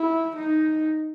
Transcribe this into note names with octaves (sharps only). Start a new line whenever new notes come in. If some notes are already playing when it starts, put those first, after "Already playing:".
Already playing: E4
D#4